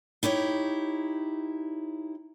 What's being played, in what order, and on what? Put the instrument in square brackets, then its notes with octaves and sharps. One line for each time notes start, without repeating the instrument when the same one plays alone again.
[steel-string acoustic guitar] D#4 E4 G4 C#5